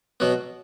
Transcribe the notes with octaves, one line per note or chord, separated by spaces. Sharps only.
B2 F#3 B3